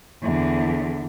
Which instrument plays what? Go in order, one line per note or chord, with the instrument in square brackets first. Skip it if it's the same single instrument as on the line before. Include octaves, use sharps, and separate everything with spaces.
[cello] E2 D3